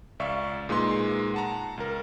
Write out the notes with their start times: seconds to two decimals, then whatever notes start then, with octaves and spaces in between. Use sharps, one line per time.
0.20 C#2 D5 E5 F5 C#6
0.69 A#2 G#3 D#4 B4 C6
1.34 F#5 A5 A#5
1.77 C#2 A#4